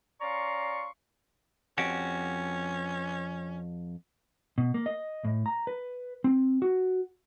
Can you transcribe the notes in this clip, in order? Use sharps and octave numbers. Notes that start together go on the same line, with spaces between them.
C#4 D5 F5 A#5 C6 C#6
F2 C#4 F#4 G4
B2
A#3
D#5
A2
A#5
B4
C4
F#4